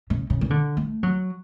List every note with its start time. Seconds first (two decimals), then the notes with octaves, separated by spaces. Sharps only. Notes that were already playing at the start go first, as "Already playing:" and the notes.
0.10 C#3
0.30 C#3
0.41 E3
0.50 D3
0.77 A3
1.03 F#3